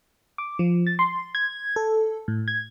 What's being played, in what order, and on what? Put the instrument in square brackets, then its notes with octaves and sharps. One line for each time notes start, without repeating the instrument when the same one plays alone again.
[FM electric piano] D6
F3
A6
C6
G#6
A4
A2
G#6